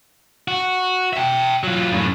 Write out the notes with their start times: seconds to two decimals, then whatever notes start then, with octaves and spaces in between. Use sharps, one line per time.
0.48 F#4
1.13 E5 G5
1.63 F#3 F4
1.92 F#2 A2